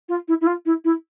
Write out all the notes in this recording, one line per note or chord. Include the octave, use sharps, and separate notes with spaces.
F4
E4
E4
F4
E4
E4